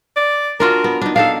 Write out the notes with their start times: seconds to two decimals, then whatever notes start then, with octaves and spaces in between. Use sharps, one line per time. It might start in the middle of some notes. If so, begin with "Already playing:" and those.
0.17 D5
0.60 D4 F4 F#4 A#4
0.84 B3
1.01 D4 D#4
1.16 D4 D#4 A4 F5